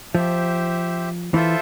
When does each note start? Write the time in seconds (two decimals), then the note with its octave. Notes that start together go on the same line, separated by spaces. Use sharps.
0.14 F3 G4 C5 E5
1.34 E3 F4 A4 C5 E5